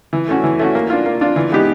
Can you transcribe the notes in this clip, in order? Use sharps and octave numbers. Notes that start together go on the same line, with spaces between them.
E3
A3 C#4 F#4
E3
A3 C#4 F#4
A#3
D4 F4
A#3
D4 F4
E3
G#3 B3 D#4 G4